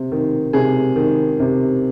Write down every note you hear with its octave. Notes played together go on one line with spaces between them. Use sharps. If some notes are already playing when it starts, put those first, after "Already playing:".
Already playing: C3
D#3
C3 G#4
D#3
C3